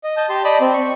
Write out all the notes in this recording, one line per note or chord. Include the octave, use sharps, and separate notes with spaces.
D#5
D#5 A5 G6
G4 A5 C6
D5 D#5 A5 B5
C4
C#6